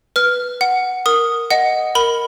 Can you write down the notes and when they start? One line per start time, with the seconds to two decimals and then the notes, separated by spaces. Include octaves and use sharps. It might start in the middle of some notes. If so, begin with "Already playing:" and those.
0.16 B4 F6
0.61 F#5
1.06 A#4 D#6
1.51 D#5 F#5
1.95 A#4 B5